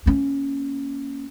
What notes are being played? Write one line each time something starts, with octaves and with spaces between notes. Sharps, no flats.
A#3 C#4